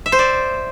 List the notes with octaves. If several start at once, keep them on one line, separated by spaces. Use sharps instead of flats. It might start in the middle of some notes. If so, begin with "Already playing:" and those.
E5
C5
D5